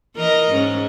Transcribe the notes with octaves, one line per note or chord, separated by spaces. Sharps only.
E3 A#4 D#5
G#2 C#4